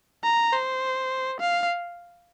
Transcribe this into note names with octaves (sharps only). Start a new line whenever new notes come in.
A#5
C5
F5